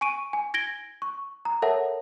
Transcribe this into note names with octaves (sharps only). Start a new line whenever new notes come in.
G#5 C#6 D7 D#7
G#5
G#6 A#6 D7 G7
C#6
A#5
A4 A#4 C#5 E5 F#5 A5